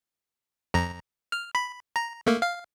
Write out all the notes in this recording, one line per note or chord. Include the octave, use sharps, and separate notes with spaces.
F2 A#5
F6
B5
A#5
A3 A#3
F5